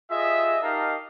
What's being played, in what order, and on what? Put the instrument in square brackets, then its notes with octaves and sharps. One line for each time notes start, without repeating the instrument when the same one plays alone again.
[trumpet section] F4 G4 G#4 D#5 E5
D#4 G4 A#4 D#5 F5 A5